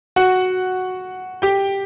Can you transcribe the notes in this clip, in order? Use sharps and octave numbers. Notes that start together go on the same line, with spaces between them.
F#4 F#5
G4 G5